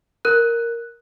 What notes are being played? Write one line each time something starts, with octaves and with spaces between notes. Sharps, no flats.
A#4 F#6